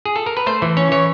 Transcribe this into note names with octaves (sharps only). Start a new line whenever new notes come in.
G#4
A4
A#4
B4
A3 C5
E3
C#4 C#5
E3 C#5